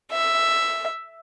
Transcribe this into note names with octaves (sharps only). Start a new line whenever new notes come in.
E5